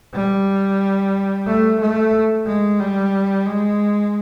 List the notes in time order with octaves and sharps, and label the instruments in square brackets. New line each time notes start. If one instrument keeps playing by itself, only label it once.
[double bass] G3
A3
A3
G#3
G3
G#3